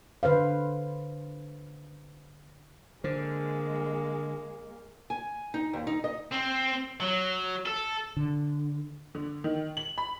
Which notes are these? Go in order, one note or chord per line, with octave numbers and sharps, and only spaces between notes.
D3 B4 C5 F5
D3 G#3 A#3 C5
G#5
D#4
D#2
D#4
D#5
C4
F#3
A4
D3
D3
D#3
F#7
B5